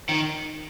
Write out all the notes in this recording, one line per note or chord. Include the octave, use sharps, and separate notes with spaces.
D#3